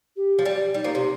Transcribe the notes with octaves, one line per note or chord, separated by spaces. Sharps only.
G4
F3
G3
G3 D#4
F3 A#3
C3